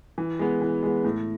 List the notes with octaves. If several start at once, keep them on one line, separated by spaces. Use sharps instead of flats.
E3
G#3 B3
E3
G#3 B3
A2